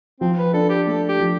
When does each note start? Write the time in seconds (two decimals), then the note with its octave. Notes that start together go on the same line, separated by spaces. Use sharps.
0.21 F3 C4
0.38 B4
0.53 D4 A4
0.70 G4
0.87 A3 A4
1.08 G4
1.19 F3